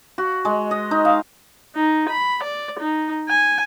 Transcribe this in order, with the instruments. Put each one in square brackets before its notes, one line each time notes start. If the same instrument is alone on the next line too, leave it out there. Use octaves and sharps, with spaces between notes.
[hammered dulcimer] F#4
G#3
D#5
D#4
F5
[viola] D#4
B5
D5
D#4
G#5